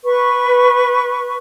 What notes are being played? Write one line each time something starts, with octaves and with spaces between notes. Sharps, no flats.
B4 C#6